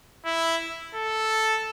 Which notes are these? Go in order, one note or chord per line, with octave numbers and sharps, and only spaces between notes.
E4
A4